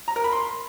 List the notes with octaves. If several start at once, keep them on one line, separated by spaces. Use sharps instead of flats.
A#5
A#4
B5
C6